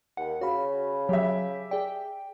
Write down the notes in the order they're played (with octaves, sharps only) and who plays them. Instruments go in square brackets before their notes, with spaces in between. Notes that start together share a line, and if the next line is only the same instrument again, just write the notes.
[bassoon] D#2 [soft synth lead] F#5
[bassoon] C#3 [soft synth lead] F#4 [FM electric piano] C#5 F5 B5
[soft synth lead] F#3 [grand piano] G4 E5
[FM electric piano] G#4 D5 [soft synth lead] G5